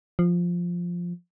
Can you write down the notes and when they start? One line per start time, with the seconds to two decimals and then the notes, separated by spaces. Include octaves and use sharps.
0.19 F3